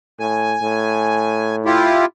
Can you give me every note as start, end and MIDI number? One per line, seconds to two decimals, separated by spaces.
0.20 0.56 45
0.20 1.56 80
0.62 2.01 45
1.66 2.05 64
1.66 2.05 65
1.66 2.05 67